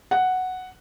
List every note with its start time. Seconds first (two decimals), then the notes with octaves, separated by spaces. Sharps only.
0.11 F#5